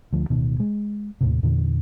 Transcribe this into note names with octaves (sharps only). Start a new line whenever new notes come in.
D2 F3
D1 B2 D#3
G#3
D#2 A2 C3
E2 A#2 D3 E3